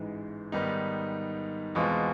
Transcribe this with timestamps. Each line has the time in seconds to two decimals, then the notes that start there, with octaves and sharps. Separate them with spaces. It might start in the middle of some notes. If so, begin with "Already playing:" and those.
Already playing: A1 G#2 E3 G#3
0.52 G#2 D#3 G3 B3 D#4
1.75 E2 B2 G#3 C4 F4